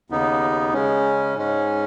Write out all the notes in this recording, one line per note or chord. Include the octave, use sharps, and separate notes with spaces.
D#2 C#3 B3 D#4
C#3 G#3 C#4
G#2 G#3 C#4